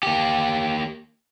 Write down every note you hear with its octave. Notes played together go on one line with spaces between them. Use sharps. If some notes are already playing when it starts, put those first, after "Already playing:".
A#3 G4